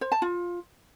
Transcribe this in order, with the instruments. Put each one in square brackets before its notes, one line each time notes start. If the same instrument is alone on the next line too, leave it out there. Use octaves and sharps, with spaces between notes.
[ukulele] C5
A5
F4